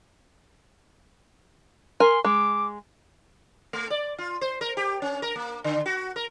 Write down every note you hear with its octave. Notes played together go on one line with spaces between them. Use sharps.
A#4 G#5 C6
G#3 D6
A3
D5
F4
C5
A#4
G4
C#4
A#4
A#3
D3
F#4
A#4